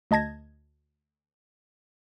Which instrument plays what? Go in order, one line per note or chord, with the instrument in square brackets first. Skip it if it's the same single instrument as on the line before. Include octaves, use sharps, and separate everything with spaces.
[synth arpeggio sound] D2 D#5 A5 G#6 A#6